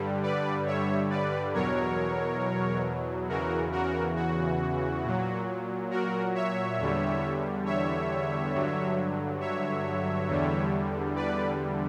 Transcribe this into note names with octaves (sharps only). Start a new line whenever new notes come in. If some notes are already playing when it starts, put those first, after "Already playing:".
Already playing: G2 D3 G3
B4 D5
C#5 E5
B4 D5
E2 B2 F#3 A#4 C#5
E2 C#3 E3 F#4 A#4
F#4 A#4
F#4
A#2 F#3
F#4 A#4
C#5 E5
E2 D3 G3
C#5 E5
G2 D3 F#3
C#5 E5
E2 D3 G3
B4 D5